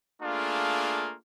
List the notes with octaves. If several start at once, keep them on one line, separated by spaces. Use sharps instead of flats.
A3 A#3 D4 F4 G#4